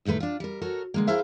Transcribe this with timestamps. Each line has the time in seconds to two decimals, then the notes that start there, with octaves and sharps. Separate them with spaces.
0.05 D#2 A2 D#3 A3 B4
0.20 D4 F4
0.40 G3 A#4
0.61 F#4 A4 A#4 C#5
0.94 D3 G#3 A#3
1.07 E4 G#4 A#4 C5 E5 F5